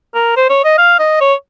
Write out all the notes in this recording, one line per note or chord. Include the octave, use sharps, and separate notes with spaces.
A#4
C5
C#5
D#5
F5
D#5
C#5